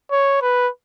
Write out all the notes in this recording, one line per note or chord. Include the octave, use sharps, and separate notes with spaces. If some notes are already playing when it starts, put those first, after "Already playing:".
C#5
B4